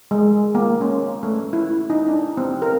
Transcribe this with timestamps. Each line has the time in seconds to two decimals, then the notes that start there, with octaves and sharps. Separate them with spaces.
0.11 G#3
0.55 A#3
0.81 C#4
1.23 A3
1.53 E4
1.90 D#4
2.08 D4
2.38 C4
2.62 A#4